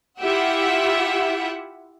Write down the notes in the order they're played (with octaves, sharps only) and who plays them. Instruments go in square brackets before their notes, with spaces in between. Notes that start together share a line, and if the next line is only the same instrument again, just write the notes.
[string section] E4 F4 G4 E5 F#5